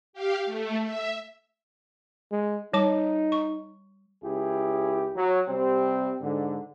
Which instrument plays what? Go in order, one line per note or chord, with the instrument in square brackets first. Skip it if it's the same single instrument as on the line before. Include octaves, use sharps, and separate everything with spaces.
[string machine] G4 F5
A3
E5
[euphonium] G#3
[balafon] G3 A5 D6 [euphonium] D#4
[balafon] C#6
[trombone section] C#2 E4 G4 G#4
F#3
C3 G3 C4
G#2 D3